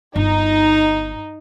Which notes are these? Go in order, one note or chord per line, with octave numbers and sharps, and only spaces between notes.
G1 D#4